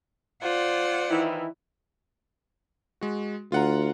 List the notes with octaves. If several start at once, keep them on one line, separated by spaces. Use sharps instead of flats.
F4 C5 D5 F#5
D#3 E3 E4
G#3 F#4
D2 F4 F#5 A#5